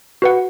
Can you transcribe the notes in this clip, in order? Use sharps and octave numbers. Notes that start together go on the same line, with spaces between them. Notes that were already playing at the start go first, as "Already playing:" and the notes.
F#4 B4 F#5